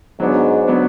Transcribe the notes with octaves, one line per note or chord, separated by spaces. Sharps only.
G#2 F#3 B3 D4
F#3 B3 D4